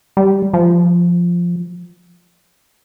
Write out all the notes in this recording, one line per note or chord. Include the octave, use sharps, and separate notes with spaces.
G3
F3